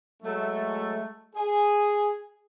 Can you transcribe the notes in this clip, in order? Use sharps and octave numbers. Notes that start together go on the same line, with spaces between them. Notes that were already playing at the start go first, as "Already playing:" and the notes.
F#3 G#3 A3
G#4